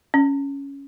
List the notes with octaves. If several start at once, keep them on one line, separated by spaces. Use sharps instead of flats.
C#4